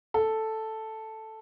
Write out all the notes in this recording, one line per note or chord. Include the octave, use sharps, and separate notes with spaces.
A4